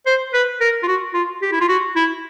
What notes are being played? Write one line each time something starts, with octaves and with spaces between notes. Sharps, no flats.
C5
B4
A#4
F4
F#4
F4
G4
E4
F4
F#4
E4